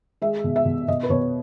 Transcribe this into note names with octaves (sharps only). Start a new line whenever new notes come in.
G#3 E5
B2
E5
B2
B2 D#5
B4
B2 C#5